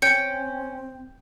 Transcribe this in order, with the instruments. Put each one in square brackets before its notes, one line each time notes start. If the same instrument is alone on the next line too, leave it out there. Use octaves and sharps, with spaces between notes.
[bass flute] C4 [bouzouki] C#4 [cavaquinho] G5 [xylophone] G6 C#7